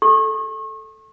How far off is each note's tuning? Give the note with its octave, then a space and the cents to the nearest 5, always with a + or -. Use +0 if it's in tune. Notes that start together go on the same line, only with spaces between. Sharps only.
A4 -5 C#6 -40